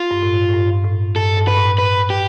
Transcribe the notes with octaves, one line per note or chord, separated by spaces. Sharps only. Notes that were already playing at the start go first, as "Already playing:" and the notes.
Already playing: F4
G2
A2
A2
G2
A2
G2 A4
G2
B4
A2
B4
G4